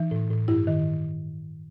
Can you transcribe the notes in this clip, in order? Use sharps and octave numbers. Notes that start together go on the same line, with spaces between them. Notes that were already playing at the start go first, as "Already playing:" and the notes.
Already playing: E3 D#4
A2
A2
G2 E4
D#3